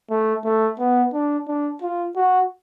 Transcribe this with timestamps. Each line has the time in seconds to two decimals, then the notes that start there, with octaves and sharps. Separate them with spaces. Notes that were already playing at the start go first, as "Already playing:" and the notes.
0.10 A3
0.45 A3
0.79 B3
1.13 D4
1.47 D4
1.82 F4
2.16 F#4